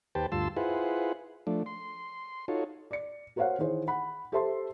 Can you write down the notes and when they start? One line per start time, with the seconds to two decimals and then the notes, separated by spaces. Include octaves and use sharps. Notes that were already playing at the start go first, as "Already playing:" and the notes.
0.15 D#2 G4 B4 C5 G5 A5
0.32 D2 G2 F4 A5 C6 E6
0.57 E4 F4 G#4 B4 C5 F#5
1.47 F3 A3 D4
1.66 C6
2.48 D#4 F4 F#4 A4 C#5
2.91 D5 C#7
3.36 F#4 A#4 C5 C#5 F5 F#5
3.58 D#3 E3 G#4 C5 C#5
3.88 F#5 B5
4.32 G4 A4 C5 E5 A5 C6